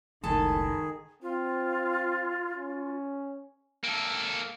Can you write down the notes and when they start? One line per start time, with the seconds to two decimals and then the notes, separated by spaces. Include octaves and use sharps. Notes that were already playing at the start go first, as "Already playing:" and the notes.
0.24 F#1 C#2 A2 D#3 G#4 A4 B4 A5
1.22 C4 F4
2.56 C#4
3.84 A#3 A4